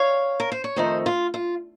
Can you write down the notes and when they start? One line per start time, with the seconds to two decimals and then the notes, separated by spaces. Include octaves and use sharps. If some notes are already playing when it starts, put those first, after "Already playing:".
Already playing: C#5 F5
0.40 A#4
0.52 C5
0.64 C#5
0.76 F2 D#3 A3 D#4 C5 D#5
1.06 F4
1.34 F4